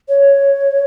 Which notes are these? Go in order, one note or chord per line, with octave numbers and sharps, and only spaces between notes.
C#5